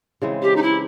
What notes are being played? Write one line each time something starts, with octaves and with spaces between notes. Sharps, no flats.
C#3 E3 G#3 C4
G4
D#4
E4